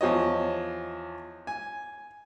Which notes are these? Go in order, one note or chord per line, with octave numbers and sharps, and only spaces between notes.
E2 F3 C#5 D#5
G#5